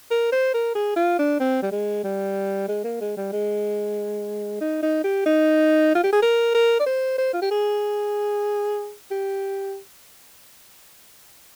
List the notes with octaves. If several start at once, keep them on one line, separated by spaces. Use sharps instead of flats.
A#4
C5
A#4
G#4
F4
D4
C4
G3
G#3
G3
G#3
A#3
G#3
G3
G#3
D#4
D#4
G4
D#4
F4
G4
G#4
A#4
A#4
D5
C5
C5
F4
G4
G#4
G4